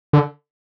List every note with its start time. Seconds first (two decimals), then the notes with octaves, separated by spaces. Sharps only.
0.13 D3